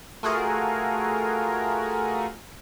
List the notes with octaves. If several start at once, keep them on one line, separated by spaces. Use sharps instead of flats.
A3 F4 F#4 G#4 A#4